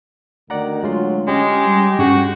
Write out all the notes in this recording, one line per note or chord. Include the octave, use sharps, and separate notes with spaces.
D2 D#3 D5 F#5 A#5
F#3 G#3 F4 C6
G#3 C#4 G4
G3
G2 C#4 F#4 G#4